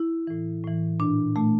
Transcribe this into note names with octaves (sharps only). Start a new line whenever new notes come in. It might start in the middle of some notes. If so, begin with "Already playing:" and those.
Already playing: E4
A2 E3
A2 E3
A#2 D4
A#2 A3